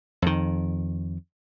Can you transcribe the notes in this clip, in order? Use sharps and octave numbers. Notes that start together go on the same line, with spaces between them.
F2 D#3